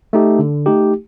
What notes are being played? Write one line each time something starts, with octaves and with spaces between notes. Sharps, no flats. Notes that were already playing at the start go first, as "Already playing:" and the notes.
A3 D#4 G4
D3
A3 D#4 G4